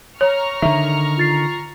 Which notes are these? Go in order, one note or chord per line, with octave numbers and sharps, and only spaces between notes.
C#5 A#5 C#6 F6
D3 D#3 E5
F4 A6 C7